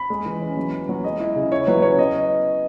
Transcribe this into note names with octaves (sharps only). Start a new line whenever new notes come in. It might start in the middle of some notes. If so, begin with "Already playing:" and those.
Already playing: B5
G#3
E3
C#4
F#3
B3
F#3
G#3 D#5
E4
C#3
E4 C#5
F#3 B4
C#4 C#5
B3 D#5